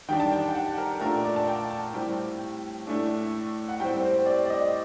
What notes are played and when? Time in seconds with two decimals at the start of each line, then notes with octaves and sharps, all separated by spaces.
0.09 D#3 G3 D4 G5
0.20 A5
0.32 G5
0.48 G5
0.55 F#5
0.77 A#4
1.01 A#2 A3 D4 A#4
1.24 D5
1.36 A5
1.47 G5
1.71 A5
1.94 A2 G3 C4 G5
2.87 A2 A3 D4
3.69 F#5
3.80 A2 G3 C4 G5
4.03 C5
4.26 D5
4.45 D5
4.50 D#5